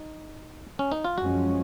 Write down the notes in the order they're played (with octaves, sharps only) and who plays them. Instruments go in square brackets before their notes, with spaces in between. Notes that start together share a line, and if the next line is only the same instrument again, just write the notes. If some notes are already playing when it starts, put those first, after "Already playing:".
Already playing: [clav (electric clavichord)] D#4
C#4
D#4
F4
[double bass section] F#2 F3 G#3 C#4 [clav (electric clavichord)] F#4